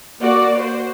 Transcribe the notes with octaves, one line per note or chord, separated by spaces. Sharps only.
A#3 F#4 D5
F#4 C5